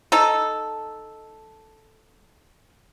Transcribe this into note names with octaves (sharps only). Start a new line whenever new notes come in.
D#4 A4